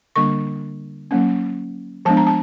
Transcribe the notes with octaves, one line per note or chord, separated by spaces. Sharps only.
D3 G3 A#3 D4 C#6
F#3 A#3 C#4
F3 G#3 B3 D4 A5
A#5
A5